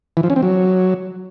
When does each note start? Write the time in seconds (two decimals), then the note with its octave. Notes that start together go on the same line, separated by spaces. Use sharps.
0.17 E3
0.23 F3
0.30 C#4
0.36 C4
0.43 F#3